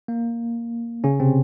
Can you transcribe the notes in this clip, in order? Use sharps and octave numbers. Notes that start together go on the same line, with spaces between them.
A#3
C#3 C#4
C3 C4